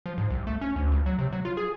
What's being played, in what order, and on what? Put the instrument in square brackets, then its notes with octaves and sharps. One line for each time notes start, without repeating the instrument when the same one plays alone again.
[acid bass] F3
G#2
C2
A3
C#4
D2
C#2
F#3
C3
F#3
F4
G#4